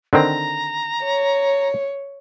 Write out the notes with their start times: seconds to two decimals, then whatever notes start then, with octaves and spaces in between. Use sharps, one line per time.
0.13 D3 D#3 C4 A#5
1.04 C#5